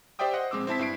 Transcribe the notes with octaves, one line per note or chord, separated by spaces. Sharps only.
G4 C5 D5 E5 G5 D#6
C5 D#5 F#5
A#1 G#3 C4 D6 E6
C4 E4 A5 B6
G2 E4 C7 D7